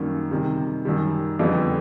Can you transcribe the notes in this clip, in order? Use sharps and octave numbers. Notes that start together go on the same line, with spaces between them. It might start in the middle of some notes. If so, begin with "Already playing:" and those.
Already playing: F#2 D#3 G3 A#3 C#4
C3 D#3 G3
F#2 D#3 G3
F2 D3 G3 B3